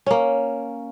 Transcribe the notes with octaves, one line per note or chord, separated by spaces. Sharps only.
A#3 C#4